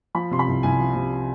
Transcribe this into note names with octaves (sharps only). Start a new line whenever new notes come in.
F3 B5
C3 C6
B5
C2
C2 G#5
F3
C3